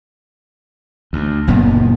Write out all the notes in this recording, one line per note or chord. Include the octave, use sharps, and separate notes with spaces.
D2
F#1 F#2 A#2 B3